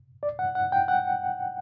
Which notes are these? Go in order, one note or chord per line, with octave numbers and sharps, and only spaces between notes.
D5
F#5
F#5
G5
F#5